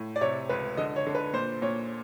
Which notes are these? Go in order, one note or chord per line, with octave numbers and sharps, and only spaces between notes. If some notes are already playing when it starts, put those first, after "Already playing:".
Already playing: A2
D5
C3 C#5
C#2 B4
D3 D#5
C#5
D3
B4
A#2 C5
A#2 C#5